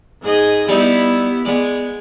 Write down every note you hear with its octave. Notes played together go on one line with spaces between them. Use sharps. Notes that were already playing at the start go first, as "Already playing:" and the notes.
G#2 G#4 D#5
G3 B3 D#4 E4
G#3 B3 D5